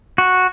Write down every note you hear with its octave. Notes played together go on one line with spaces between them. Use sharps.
F#4